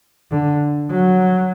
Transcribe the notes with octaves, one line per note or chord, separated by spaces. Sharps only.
D3
F#3